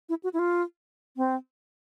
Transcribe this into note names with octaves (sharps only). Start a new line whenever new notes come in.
E4
F#4
E4
F4
C4